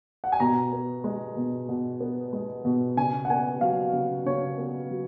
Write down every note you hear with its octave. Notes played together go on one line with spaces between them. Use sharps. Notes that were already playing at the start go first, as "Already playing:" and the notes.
F#5
G#5
B2 A#5
B3
G#3
B2
B2
B3
G#3
B2
C#3 G#5
F#5
B3 G#5
F#3 F5
C#3
C#3 C#5
B3
F#3